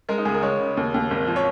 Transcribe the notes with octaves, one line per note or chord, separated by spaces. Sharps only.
G#3 A#4
D#4
C#2 G#4
A#4
G#3 C#5
C#3
D#2
D#2
G#1
F3
C#5